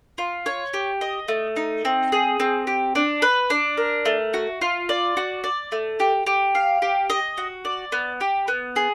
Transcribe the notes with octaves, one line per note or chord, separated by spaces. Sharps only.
F4
C#5
G4
D#5
A3
D#4
C4
G#4
C4
G4
D4
B4
D4
A#4
A3
F#4
F4
D5
F#4
D5
A3
G4
G4
F5
G4
D#5
F#4
D5
B3
G4
B3
G#4